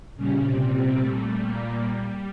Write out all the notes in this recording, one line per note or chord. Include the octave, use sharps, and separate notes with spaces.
A#2 C#3 G3 C#4
C3 C4
C3 C4
A3
A#2 A#3